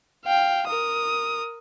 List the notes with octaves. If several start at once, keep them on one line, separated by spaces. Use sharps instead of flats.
F5 G5
A#4 D#6